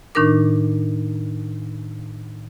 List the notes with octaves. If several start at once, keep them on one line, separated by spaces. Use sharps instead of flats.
A2 D#3 D4 D#4 A#4 D6